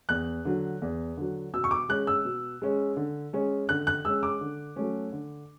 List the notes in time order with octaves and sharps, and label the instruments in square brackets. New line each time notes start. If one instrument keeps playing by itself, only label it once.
[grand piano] E2 F#6
D3 F#3
E2
D3 F#3
B2 E6
C#6
D6
G#3 C#4 F#6
E6
B2
G#3 C#4
D3
G#3 C#4
D3 F#6
F#6
G#3 C#4 E6
D6
D3
F#3 A3 C#4
D3